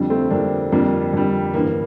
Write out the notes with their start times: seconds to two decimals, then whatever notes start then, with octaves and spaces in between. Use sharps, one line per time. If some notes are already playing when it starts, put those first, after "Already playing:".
Already playing: F2 D3 G3
0.10 A3 C4
0.30 F2 D3 G3 A#3 D4
0.72 F2 D3 G3 A#3 D4
1.14 F2 D3 G3
1.54 A1 G2 D3 A#3